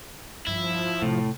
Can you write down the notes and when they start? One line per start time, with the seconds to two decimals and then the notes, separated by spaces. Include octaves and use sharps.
0.47 G2 F3 E4
1.02 A2 C3